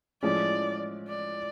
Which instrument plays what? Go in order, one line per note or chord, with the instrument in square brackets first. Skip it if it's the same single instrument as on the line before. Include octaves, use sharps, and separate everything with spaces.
[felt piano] A2 F3 G#3 C#4 [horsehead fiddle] D5
[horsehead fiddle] D5